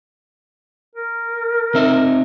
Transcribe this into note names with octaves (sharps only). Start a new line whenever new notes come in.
A#4
C4 D#4 E5